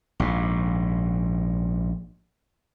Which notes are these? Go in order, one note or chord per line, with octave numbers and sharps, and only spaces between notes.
A#1 G#2